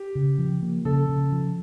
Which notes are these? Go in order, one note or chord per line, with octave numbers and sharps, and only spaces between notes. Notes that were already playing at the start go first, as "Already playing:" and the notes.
Already playing: G4
C#3
F3
A#3
C#3 A4
C#3
F3